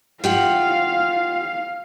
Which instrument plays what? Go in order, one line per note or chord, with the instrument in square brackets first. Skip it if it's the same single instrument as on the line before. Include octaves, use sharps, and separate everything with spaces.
[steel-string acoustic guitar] F4 G4 F#5 [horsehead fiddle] F5